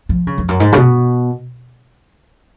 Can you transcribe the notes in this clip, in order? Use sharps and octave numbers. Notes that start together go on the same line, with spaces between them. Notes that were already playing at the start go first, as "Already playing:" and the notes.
F3
C#3
F2
F#2
G#2
C#3
B2